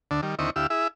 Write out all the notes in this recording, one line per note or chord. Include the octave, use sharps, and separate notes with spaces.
D2 D3 D4
D#3 G3
D#2 D3 C4 E4 D#5 C#6
D2 E4 G4 F5 E6
E4 G#4 E5